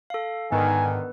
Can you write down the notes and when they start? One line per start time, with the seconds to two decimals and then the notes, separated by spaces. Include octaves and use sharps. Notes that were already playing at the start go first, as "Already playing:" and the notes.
0.10 A4 F5
0.52 G#2 D3 D#3 B3 B4 G#5